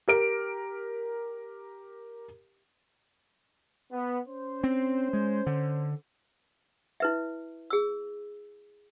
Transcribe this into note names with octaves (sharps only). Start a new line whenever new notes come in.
G4 A#4 D7
B3
C#4 C5
C4
G#3
D3
E4 B4 E5
G#4 E6